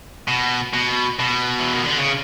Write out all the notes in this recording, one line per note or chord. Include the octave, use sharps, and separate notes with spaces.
B2
B2
B2
E3
D#3
D3
C#3